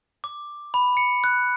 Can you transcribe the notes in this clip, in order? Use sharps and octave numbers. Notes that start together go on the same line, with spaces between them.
D6
B5
C#7
F#6